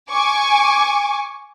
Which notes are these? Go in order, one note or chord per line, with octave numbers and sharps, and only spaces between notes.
G#5 C#6 D6